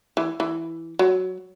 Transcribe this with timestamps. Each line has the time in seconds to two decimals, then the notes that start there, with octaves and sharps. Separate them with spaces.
0.17 E3
0.40 E3
0.99 F#3